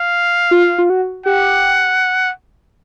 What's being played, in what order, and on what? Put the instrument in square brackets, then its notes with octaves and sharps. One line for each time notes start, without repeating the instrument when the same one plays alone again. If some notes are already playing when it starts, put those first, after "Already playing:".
Already playing: [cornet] F5
[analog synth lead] F4
F4
F#4
[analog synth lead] G4 [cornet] F#5